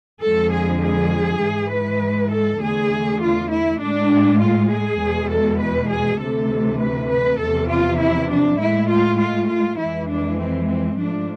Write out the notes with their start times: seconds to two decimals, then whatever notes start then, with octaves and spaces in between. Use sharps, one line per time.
0.22 F2 D3 F3 G#3 A4
0.52 G#4
0.82 G#4
1.41 G#2 E3 G#3
1.72 B4
2.32 A4
2.61 E2 D3 A3 G#4
3.21 F4
3.51 E4
3.81 A2 G#3 D4
4.41 F4
4.71 G#4
5.00 E2 B2 G#3
5.30 A4
5.60 B4
5.91 G#4
6.20 D2 C3 E3 A3 A4
6.79 B4
7.09 B4
7.39 E2 C3 F3 A4
7.69 F4
7.99 E4
8.29 D4
8.59 A2 G#3 E4
8.89 F4
9.19 F4
9.48 F4
9.79 F2 E3 G#3 E4
10.08 D4
10.38 C4
10.68 C4
10.98 G#2 F3 A3 D4